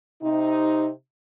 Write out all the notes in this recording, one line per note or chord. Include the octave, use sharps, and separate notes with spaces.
C3 D#4